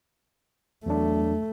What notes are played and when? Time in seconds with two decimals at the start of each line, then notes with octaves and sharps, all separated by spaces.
0.86 E2 F#3 A3 D4